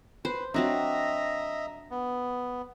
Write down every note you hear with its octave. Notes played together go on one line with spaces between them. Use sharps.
B4 C5
F#3 C4 D4 D#5 E5 A#5
B3